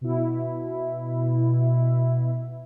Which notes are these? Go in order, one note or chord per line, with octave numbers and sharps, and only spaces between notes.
B2 E4